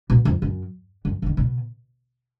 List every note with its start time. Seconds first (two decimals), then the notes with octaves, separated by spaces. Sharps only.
0.10 B2
0.25 F2
0.42 F#2
1.05 F#2
1.22 C#3
1.26 D#3
1.37 B2